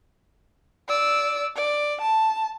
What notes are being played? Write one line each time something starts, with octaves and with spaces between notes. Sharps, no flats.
D5 E6
D5
A5